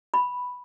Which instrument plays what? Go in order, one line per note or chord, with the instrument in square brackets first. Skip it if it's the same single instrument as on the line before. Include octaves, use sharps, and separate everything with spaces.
[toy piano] B5